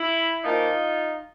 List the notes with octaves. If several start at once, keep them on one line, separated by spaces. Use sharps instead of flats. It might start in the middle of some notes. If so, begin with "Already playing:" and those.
Already playing: E4
A#2 F3 A#3 D#4 F4